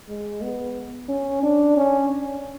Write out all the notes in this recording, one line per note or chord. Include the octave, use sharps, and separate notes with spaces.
G#3
B3
C#4
D4
C#4
C#4